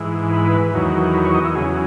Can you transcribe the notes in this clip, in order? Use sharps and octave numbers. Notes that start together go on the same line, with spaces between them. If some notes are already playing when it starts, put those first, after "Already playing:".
Already playing: G#2 E3
B4
E2 D#3 F#3
B4
C#5
D#5
E4
E2 C#3 F#3 G#4